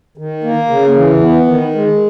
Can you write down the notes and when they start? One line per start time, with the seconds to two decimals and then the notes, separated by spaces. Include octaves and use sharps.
0.18 D#3
0.44 A#3
0.70 C#3
0.96 E3
1.21 B3
1.48 D#3
1.75 G#3